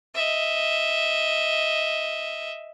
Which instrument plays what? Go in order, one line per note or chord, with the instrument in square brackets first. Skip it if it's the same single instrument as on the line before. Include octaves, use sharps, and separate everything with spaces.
[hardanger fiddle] D#5 E5